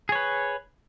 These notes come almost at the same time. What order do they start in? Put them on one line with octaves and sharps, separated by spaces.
G#4 C#5 B4